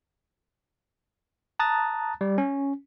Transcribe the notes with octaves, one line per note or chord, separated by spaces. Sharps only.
A5 A#5 D#6 F#6 A6
G3
C#4